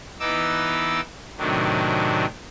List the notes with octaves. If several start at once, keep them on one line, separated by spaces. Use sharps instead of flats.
E3 B3 D#4 D6 E6
A2 C3 D#3 F#3 D4